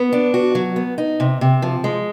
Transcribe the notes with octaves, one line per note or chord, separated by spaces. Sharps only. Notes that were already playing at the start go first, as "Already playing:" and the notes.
Already playing: B3
D4
F#4
F#3
B3
D#4
C3
C3
F3
G#3